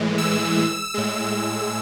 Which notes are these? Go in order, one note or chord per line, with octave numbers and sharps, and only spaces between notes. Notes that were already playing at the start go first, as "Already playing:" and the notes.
Already playing: A2 E3 G#3
E6
A2 G#3